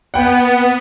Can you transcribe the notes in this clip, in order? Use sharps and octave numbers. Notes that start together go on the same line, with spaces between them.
B3 F#5 G5